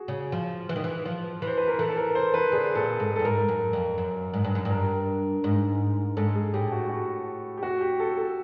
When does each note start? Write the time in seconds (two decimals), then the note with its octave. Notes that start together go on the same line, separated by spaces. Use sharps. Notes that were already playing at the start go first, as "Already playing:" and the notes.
Already playing: F#4 G#4
0.08 C#3
0.32 F3
0.69 E3
0.76 D#3
0.84 E3
1.05 F3
1.42 E3
1.47 C5
1.58 B4
1.68 A#4
1.78 E3 A4
1.89 A4
1.97 A#4
2.15 C5
2.34 B4
2.52 D3 G#4
2.75 A#2 A4
3.00 G#2 A4
3.16 A4
3.19 G2
3.25 G#2 A#4
3.48 F#2
3.73 F2
3.98 F#2
4.34 G#2
4.44 G2
4.55 F#2
4.65 G2
4.70 A#4
5.44 G#2
6.17 G#2 A4
6.35 G#4
6.53 A2 G4
6.72 F#4
6.89 F#4
7.57 G4
7.63 F#4
7.81 G4
8.00 A4
8.17 A4